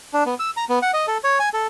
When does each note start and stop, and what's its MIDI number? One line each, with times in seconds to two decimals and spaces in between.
0.13 0.24 62
0.26 0.35 59
0.39 0.50 88
0.57 0.65 82
0.69 0.79 59
0.82 0.91 78
0.93 1.06 75
1.07 1.18 69
1.24 1.39 73
1.40 1.49 80
1.53 1.67 69